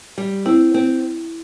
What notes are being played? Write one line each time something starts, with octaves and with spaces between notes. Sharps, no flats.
G3
C4 E4
C4